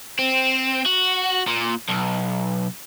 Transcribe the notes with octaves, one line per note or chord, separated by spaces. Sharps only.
C4
F#4
A#2
B1